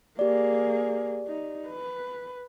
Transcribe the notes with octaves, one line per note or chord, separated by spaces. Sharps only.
A#3 G4 G#4 D5
D#4
B4